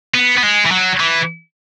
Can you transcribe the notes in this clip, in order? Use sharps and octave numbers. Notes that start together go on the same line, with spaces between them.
B3
B3
G#3
E3
F#3
E3